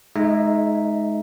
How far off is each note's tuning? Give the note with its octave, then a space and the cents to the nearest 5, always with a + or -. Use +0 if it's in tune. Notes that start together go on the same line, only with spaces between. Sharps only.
G#3 +25 D#4 +0 E5 +0